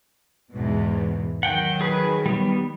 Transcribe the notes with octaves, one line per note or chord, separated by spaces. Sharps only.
E2 G#2 B2
D#3 F#3 F#5 G5
G#4 B4
G3 B3